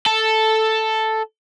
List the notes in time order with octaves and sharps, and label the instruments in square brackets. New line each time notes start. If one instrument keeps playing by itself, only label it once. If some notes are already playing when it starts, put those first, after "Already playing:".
[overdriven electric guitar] A4